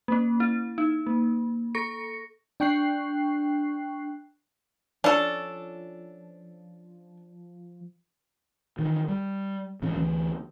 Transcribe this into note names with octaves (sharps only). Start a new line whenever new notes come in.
A#3 C#4
E4
D#4
A#3
A4 C#6 A#6 C#7
D4 G5 C#6 F#6 C7
F3 C#4 D4 A4
D#3 E3
G3
G#2 E3 C#4
D2 E3